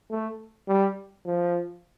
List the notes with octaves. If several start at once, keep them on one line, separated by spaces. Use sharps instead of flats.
A3
G3
F3